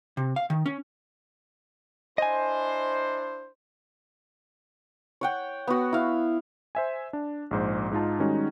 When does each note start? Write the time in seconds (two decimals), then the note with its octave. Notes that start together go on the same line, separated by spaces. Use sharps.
0.17 C3
0.36 F5
0.50 D#3
0.66 C#4
2.18 D4 E4 C5 D#5 G#5
5.21 C#5 F#5 G5
5.67 B3 F#4
5.93 E4 F5
6.75 C5 E5 G#5
7.13 D4
7.51 A#1 G#2 C5
7.91 G#2 D#4 F4 A5
8.19 D#3 G3 G#3 C#4 D#4 F#4